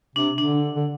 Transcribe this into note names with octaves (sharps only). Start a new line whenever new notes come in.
C3 D4
D3 D4
D3